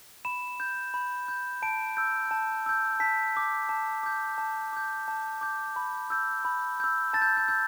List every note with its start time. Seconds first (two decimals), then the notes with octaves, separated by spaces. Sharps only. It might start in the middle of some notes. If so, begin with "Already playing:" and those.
0.25 B5 E7
0.60 G6
0.94 B5
1.28 G6
1.62 A5 D7
1.97 E6 G6
2.31 A5
2.66 E6 G6
3.00 A5 B6
3.35 D6 G6
3.69 A5
4.03 D6 G6
4.38 A5
4.73 D6 G6
5.08 A5
5.41 D6 G6
5.76 B5
6.10 E6 G6
6.45 B5
6.80 E6 G6
7.13 A5 A6
7.22 G6
7.37 G6
7.48 E6 G6